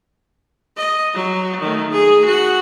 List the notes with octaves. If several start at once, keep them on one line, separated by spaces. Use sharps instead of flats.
D#5
F#3
D#3 A3
G#4
F#4 F#5